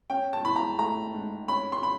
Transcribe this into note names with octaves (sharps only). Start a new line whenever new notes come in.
C#4 G5
A5
E3 B5
A#5
A3 A#5
G#2
C#4 B5
C6
B5